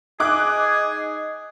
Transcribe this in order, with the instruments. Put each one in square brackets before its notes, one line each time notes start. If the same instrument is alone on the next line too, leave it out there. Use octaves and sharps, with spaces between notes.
[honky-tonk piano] D#4 D6 F#6 [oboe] G#4